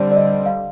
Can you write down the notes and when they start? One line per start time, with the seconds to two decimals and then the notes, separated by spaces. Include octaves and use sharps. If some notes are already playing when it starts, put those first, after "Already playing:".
Already playing: D3 G3 C4 D5
0.12 D5
0.16 D#5
0.46 F5